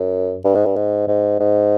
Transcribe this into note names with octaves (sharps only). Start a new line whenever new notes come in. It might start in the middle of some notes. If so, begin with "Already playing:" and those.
Already playing: F#2
G2
G#2
G2
G#2
G#2
G#2